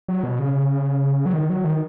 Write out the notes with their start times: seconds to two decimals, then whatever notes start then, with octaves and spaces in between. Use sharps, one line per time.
0.08 F#3
0.23 B2
0.39 C#3
1.26 F#3
1.34 D#3
1.50 F#3
1.64 D#3